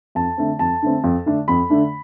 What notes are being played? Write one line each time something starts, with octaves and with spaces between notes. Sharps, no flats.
F2 A5
D3 A3 C4
F2 A5
D3 A3 C4
F2
D3 A3 D4
F2 B5
D3 A3 D4